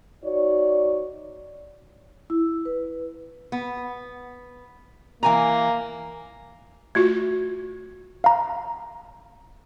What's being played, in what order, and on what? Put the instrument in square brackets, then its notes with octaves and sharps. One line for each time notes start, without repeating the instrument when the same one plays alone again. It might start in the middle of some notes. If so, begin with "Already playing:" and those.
[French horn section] D#4 F#4 C#5 D5
[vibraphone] E4
B4
[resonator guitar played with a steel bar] B3
[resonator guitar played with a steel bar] E3 G#5 A#5 [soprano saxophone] A#3
[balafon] A3 F4 F#4 [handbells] G#6
[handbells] F5 A#5